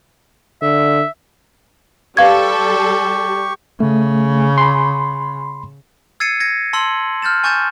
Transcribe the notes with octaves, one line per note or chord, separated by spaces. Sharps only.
D3 E5
G3 G4 A4 B4 F5 C#6 G#6
C#3 A3
B5 C6
E6 G#6 A6 C7 C#7 D#7
G#6 A#6 C#7
A5 C6 E6 F#7
F6 G6 A6 E7
G#5 C#6 G6 A6 E7